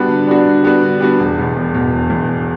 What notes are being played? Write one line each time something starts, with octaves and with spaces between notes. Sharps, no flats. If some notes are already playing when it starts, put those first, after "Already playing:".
Already playing: G3 B3 D4 F#4
D3
G3 B3 D4 F#4
D3
G3 B3 D4 F#4
D3
G3 B3 D4 F#4
E1
E2 B2
E1
E2 B2
E1
E2 B2
E1